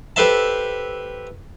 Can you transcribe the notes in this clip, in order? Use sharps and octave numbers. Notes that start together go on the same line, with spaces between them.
G4 A4 B4 C5 E5 A5